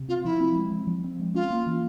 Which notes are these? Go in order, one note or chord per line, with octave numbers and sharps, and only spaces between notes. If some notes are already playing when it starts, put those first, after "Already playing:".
Already playing: C3
C4 F4
F3 E4
C4
G#3
F3
F3
C4
G#3
C#4 F4
A#3
E3